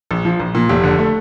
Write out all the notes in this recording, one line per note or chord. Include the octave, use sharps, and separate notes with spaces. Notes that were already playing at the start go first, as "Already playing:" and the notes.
A#1
F3
A#1
A#2
F1
D3
A3